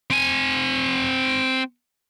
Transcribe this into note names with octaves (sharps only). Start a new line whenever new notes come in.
C4 G#5